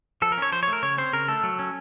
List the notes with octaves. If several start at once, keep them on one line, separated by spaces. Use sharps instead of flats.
F3 A4
A#4
C#4 C#5
F3 C5
C#5
A3
A#4
C#3 C#5
C4 C5
C#3 A#4
A3 A4
F#3
C#4